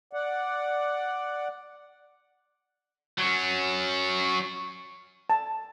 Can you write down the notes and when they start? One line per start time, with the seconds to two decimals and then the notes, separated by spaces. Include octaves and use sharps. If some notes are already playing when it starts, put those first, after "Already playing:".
0.13 D5 F#5
3.18 F#3 C#4
5.30 A5